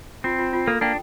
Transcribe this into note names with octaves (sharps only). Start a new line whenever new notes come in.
C4 F4
F4
F4
A#3 A4
A#3 D4 G5